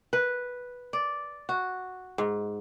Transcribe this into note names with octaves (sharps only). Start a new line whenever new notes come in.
B4
D5
F#4
G#2